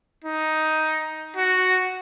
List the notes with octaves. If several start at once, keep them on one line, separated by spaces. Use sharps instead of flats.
D#4
F#4